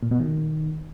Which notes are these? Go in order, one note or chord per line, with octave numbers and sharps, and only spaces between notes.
A#2
B2
D#3